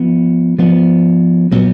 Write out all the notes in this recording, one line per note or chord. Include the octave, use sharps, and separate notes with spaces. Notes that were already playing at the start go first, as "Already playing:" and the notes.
Already playing: F3 B3
F3 B3
A#2 F#3 B3